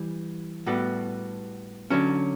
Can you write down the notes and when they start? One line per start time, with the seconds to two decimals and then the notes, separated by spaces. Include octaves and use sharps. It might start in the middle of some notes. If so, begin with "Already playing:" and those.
Already playing: E3 G3
0.66 A2 G3 B3 F#4 A4
1.90 D3 F#3 C#4